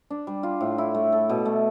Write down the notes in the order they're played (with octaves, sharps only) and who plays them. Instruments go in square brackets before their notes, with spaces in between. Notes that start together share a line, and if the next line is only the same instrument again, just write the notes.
[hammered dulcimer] D4
G3
F4
A2
E4
A3
A4
B2
A3